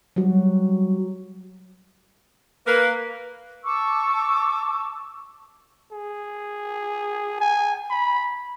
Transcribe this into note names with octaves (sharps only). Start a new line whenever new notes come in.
F#3 G3 F#4
A#3 B4
A5 C#6 D6 E6
G#4
G#5
B5